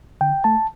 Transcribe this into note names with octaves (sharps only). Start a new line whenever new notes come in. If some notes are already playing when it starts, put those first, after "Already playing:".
D3 G5
A3 A5